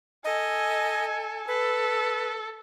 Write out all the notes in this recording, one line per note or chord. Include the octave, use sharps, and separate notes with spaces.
A4 D#5 G#5
A4 B4